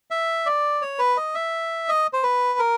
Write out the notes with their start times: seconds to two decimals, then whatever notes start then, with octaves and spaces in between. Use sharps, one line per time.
0.11 E5
0.46 D5
0.82 C#5
0.99 B4
1.17 D#5
1.35 E5
1.89 D#5
2.13 C5
2.23 B4
2.59 A#4